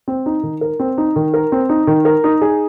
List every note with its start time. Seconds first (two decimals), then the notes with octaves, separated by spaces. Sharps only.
0.08 C4
0.26 D#4
0.43 D#3
0.61 A#4
0.80 C4
0.98 D#4
1.16 D#3
1.34 A#4
1.52 C4
1.69 D#4
1.87 D#3
2.05 A#4
2.24 D#4
2.42 G#4